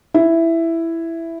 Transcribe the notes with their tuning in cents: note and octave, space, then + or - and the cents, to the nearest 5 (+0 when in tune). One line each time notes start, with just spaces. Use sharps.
E4 +5